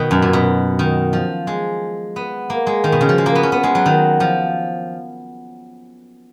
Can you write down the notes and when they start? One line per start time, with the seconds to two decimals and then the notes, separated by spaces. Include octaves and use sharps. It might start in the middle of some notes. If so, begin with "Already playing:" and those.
Already playing: B2 D#3
0.11 F#2
0.22 A#2
0.33 B2
0.79 D#3
1.13 F3
1.47 G#3
2.16 B3
2.50 A#3
2.67 G#3
2.84 D#3
2.92 B2
3.01 C#3
3.09 F3
3.18 G#3
3.26 A#3
3.35 B3
3.43 C#4
3.52 B3
3.63 G#3
3.75 F#3
3.86 D#3
4.20 F3